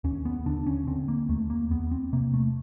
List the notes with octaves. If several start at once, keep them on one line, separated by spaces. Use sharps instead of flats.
D#2 C#4
B3
D3 D4
C#4
D3 C4
A#3
D#2 A3
A#3
E2 B3
C4
C3 A#3
A3